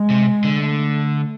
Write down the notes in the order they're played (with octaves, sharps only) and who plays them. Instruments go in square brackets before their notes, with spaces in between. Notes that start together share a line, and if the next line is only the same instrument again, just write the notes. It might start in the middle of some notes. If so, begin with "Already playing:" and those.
Already playing: [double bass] G#3
[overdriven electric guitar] C3
D3
[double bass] A3